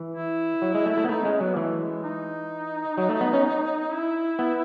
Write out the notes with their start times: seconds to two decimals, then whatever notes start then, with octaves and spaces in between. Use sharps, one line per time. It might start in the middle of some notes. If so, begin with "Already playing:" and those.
Already playing: E3
0.15 E4
0.62 F#3
0.74 G#3
0.86 A3
0.97 A3
1.04 B3
1.09 A3 D#4
1.25 G#3 C#4
1.40 F#3 B3
1.57 E3 A3
1.80 G#3
2.03 D#4
2.97 F#3
3.09 A3
3.21 B3
3.33 C#4
3.92 E4
4.39 B3